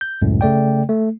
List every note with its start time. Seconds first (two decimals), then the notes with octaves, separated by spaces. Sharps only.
0.01 G6
0.22 C#2 F#2 A2
0.41 C#3 A3 D5 G5
0.89 A3